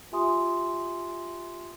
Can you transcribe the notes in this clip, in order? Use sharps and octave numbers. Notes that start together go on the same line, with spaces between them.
F4 G4 E5 G#5 C6 D#6